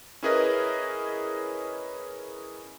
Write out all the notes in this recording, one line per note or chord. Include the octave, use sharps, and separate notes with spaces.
C#4 E4 G#4 A#4 B4 D#5